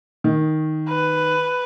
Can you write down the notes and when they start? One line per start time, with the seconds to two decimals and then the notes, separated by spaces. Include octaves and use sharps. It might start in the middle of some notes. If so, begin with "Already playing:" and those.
0.24 D#3
0.88 B4